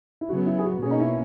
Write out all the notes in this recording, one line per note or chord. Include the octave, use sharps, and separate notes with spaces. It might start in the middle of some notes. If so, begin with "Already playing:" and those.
E4
C#3 F#3 B3 F#4
E4
G#4
F#4
B2 A#3 C#4 G#4
D#4
E4